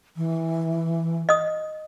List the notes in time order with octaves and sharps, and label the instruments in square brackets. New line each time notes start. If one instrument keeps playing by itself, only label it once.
[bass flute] E3
[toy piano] D#5 D#6